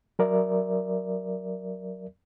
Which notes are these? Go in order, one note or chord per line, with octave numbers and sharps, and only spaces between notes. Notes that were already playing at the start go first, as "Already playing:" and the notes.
F#3 A#4 D5 E5